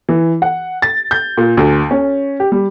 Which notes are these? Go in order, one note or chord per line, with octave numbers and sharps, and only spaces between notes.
E3
F#5
A6
G6
A#2
D2
C#4
G4
G3